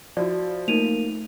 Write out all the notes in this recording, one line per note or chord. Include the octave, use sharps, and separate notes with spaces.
F3 E4 F#4 D5
A3 A#3 D#4 D#7 F7